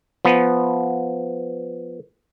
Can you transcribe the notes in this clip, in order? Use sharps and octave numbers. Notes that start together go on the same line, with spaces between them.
F3 B3